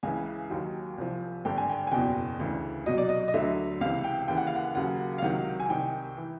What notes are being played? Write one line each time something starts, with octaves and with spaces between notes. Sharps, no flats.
C#2 C#3 E3 G#5
D#2 D#3 F#3
C2 C3 F3
G#1 G2 D3 G5
G#5
G5
G#5
F#1 E2 B2 G5
D2 C#3 E3
C2 B2 F#3 D#5
D5
D#5
D#5
D2 D3 F#3 E5
C#2 C3 E3 F5
G5
D#2 C#3 E3 G5
F#5
F5
F#5
D#2 C#3 F#3 F#5
F5
C#2 C3 D#3 F#3 F#5
G#5
C2 C3 D#3 G5
E3